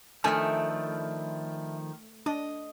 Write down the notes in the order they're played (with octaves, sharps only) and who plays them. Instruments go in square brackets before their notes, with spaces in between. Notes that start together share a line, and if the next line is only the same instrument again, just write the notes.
[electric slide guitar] D#3 F3 [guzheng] A3 [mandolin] D4 E4 [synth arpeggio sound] G#5
[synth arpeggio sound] D4 [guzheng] D#5